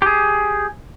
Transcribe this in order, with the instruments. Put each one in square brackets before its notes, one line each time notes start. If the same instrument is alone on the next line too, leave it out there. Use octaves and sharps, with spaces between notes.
[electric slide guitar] G4 G#4